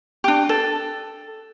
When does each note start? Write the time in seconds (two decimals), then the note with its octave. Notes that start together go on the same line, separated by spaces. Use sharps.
0.24 D4 G4
0.49 A4